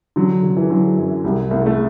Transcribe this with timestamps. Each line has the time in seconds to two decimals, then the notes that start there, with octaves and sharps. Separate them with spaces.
0.16 D3 F#3
0.43 D3
0.57 E3
0.70 D3 F#3
0.97 F#2
1.24 C2 G3
1.51 C2 A3
1.66 A3